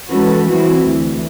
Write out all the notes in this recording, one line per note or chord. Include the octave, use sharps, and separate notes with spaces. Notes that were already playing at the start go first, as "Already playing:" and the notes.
E3 G#3 C#4 F#4 A4 B4
E3 G3 C4 E4 F#4
D2 E3